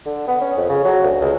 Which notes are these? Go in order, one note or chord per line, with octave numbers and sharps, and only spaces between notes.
D3
B3
C#4
F2
C#3
F#3
D2
C#2